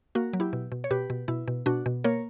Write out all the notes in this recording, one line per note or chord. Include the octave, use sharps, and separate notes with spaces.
A#3 F#4 A#4
F#3
E4 G4
B2
B2
C#5
B2 G4 B4
B2
B2 E4
B2
B2 D4 F#4
B2
A#3 A#4 C#5